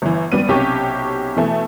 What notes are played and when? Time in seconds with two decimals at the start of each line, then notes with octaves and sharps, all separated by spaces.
0.02 G1 E3
0.32 G#1 G3 B3 D#7
0.48 B1 C3 C#4 G4 C#5 C#6
1.36 B2 E3 A3